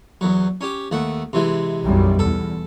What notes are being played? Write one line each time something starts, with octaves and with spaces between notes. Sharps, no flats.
E2 F#3
C#4 G4
D#2 A3 F#5
C3 E3 G#3
B1 F#2 G3
E2 A4